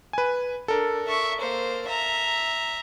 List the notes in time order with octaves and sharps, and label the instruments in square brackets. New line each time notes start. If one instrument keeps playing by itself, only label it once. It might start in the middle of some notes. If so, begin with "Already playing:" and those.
[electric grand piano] B4 G#5
[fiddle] D4 [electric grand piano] A4 A#4
[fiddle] E5 C#6
A#3 C5
E5 A#5